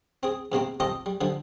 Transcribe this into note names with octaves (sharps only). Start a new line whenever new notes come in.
C4 G#4
E2 C3 A#3 C4
C4 F4 G4 A4 D#5
G3
D3 F3 G3